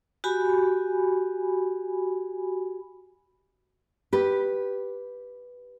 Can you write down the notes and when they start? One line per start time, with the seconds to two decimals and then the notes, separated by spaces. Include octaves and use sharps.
0.24 F#4 G4 G#5 B5
4.13 G4 B4